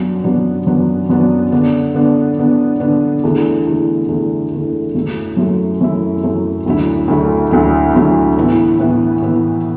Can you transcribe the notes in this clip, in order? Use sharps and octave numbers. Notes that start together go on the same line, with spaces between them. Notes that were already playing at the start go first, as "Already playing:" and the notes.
Already playing: F#2 F#3 B3 D4
F#2 F#3 B3 D4
F#2 F#3 B3 D4
F#2 F#3 B3 D4
D3 B3 D4
D3 B3 D4
D3 B3 D4
D3 B3 D4
E2 D3 A3
E2 D3 A3
E2 D3 A3
E2 D3 A3
F#2 F#3 A3 E4
F#2 F#3 A3 E4
F#2 F#3 A3 E4
F#2 F#3 A3 E4
D2 D3 F#3 A3 E4
D2 D3 F#3 A3 E4
D2 D3 F#3 A3 E4
D2 D3 F#3 A3 E4
A2 E3 B3 E4
A2 E3 B3 E4
A2 E3 B3 E4